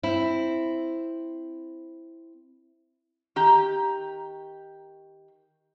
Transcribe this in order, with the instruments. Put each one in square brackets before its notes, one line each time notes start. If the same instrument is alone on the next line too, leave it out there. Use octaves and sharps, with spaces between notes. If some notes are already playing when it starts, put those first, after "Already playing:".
[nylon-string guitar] C4 E4
[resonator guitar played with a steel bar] D#3 G4 A#5